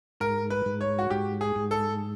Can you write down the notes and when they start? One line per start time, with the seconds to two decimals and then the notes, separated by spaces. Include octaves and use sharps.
0.20 G#2 A#4
0.50 B4
0.66 G#2
0.81 C#5
0.99 F#4
1.10 G#2 G4
1.41 G#4
1.56 G#2
1.71 A4